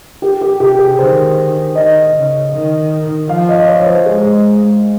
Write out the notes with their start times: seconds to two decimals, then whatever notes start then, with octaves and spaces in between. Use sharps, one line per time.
0.22 G4
0.41 G4
0.60 C3 G4
0.79 G#4
0.98 D#3 C5
1.75 D#3 D#5
2.14 C#3
2.52 D#3
3.29 F3 F5
3.49 D#5
3.68 C#5
3.86 C5
4.06 G#3 G#4